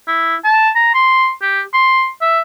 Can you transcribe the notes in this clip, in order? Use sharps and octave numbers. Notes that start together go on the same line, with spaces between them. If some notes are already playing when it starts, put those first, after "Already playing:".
E4
A5
A#5
C6
G4
C6
E5